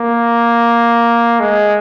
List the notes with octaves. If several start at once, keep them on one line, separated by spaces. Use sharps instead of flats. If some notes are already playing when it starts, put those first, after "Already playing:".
Already playing: A#3
G#3